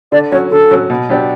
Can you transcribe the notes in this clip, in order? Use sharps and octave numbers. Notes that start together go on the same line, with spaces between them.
D3 D5
F#3 C#4 F#4 C#5
D3 A4
F#3 C#4 F#4
B2
F#3 B3 D4 G4